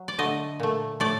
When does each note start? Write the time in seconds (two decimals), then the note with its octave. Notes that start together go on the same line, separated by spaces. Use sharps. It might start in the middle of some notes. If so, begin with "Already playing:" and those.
Already playing: F#3
0.08 D5
0.18 D3 A3 D#5
0.60 A#2 A3
1.00 A2 A3 D5